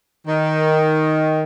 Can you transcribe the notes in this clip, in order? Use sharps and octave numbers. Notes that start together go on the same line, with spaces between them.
D#3